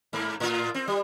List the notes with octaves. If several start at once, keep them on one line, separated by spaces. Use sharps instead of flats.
G#2 A#3
A2 F4
C4
G3